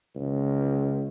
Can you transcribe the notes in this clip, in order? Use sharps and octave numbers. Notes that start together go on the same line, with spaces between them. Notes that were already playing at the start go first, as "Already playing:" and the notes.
C#2